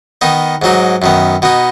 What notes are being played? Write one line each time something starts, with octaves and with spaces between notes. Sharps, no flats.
D#3 B3 D#4
G#2 F#3 D#4
F#2 D#3 B3
B2 B3 D#4